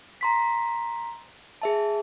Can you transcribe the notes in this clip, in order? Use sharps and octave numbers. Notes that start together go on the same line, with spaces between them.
A#5 C6 B6
G#4 E5 A5